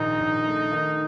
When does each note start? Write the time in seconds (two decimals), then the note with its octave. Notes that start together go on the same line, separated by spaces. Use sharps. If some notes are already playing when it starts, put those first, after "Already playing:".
Already playing: A#1 D#3 D#4
0.20 A#1
0.45 A3
0.72 D#3